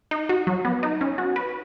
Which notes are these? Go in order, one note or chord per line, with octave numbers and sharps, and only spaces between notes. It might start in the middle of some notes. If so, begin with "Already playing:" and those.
D#4
F#4
F#3
B3
D#4
C#4
F#4
B4